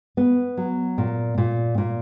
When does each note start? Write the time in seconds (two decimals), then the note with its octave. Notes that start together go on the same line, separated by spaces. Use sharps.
0.17 B3
0.57 F#3
0.98 A#2
1.38 A#2
1.78 A#2